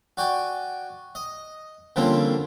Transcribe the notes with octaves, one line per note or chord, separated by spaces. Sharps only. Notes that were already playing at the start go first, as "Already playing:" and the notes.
F#4 D5 G5 G#5
D#5
D3 F3 G3 A#3 C4 C#4